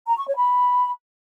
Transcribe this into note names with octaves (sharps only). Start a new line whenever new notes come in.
A#5
C#6
C#5
B5